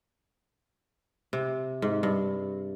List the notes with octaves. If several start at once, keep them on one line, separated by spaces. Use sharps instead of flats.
C3
G#2
G2